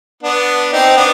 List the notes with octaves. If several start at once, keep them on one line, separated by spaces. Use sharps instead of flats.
B3 D4
C4 D#4
B3 D4